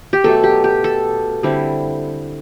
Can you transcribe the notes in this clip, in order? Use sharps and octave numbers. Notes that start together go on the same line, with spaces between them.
G4
B2 F#3 A3 A4
G4
G4
A4
D3 G3 C4 E4